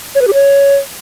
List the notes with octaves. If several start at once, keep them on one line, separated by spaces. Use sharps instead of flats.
C#5
B4
G4
C#5